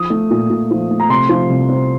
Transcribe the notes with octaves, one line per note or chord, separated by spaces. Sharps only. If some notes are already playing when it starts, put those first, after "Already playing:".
Already playing: F3 D#6
A3
A#2
A#2
F3
A3
A#5
C3 C6
F3
C2
C4